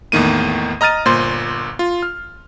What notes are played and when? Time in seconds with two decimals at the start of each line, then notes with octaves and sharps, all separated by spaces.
0.12 E2 A2 D#3 A#3 D#7
0.81 D#5 A#5 F6 A6 D#7
1.05 G1 A#2 C5 C6 A6
1.79 F4
2.03 F6